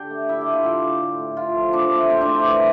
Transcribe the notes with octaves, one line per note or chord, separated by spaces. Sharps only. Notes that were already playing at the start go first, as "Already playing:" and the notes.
Already playing: D3 G4 G5
A3
D3 E4 E5
G4 G5
A3
F4 F5
D3 G4 G5
D3
A2
A2
A3 F4 F5
F3
C4 D4 D5
A3
A2 C4 C5
D4 D5
A3
E3